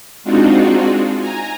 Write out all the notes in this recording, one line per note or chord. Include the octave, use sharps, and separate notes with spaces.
G#3 C4 D4 D#4 F4 F#4
G#5 A#5